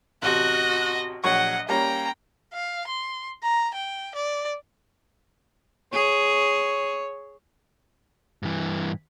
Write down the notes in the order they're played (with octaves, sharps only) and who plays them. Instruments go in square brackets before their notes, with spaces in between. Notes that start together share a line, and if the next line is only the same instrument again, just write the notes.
[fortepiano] A1 C3 [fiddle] F#4 D#5 [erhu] F#6
[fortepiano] A#1 F#3 C#6 [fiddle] D#5 [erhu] F#5
[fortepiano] G3 A#3 C#4 [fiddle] G5 [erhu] A#5
[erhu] F5
C6
A#5
G5
D5
[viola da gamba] G#4 [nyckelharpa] C#5
[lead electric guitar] G2 E3